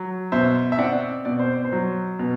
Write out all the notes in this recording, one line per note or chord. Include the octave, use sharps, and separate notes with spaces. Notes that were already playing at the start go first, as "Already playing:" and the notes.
Already playing: F#3
B2 C5 E5
E5
C4 D5 F#5
B2 D5
C5
C5
F#3
B2